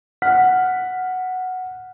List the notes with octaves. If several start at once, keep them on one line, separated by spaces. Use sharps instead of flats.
F#5 F6 B6